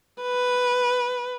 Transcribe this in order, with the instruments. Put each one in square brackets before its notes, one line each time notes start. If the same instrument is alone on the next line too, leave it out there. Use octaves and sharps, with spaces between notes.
[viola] B4